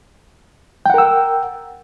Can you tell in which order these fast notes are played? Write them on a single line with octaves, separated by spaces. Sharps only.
G5 F#5 A#4 E6